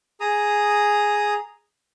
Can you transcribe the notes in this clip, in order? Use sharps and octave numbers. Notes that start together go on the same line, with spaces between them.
G#4 A#5 D#6